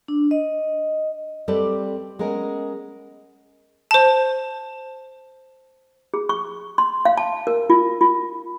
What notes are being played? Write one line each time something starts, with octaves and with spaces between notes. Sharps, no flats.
D4
D#5
G3 C4 A4 B4 D5
G#3 B3 C#4 A#4
C5 A5
G#4
C#6
C6
F5
A5
A#4
F4
F4